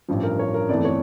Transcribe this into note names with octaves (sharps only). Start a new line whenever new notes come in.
A1 G2 F3
A#4
C#5
A#4
G1 F2 E3 A3 D5
C#5